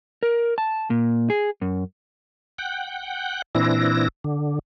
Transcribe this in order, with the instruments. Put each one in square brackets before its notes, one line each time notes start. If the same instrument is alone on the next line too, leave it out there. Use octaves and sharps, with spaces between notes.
[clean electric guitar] A#4
A5
A#2
G#4
F#2
[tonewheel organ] F#5 G5
A#2 E3 C4 D4 E4 A#6
D3